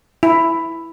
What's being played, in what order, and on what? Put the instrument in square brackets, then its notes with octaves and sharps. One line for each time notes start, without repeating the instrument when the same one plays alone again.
[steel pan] E4